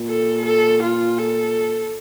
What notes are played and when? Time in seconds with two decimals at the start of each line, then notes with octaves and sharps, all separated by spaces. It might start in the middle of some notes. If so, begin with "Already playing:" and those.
Already playing: A#2
0.09 A4
0.46 A4
0.83 F4
1.18 A4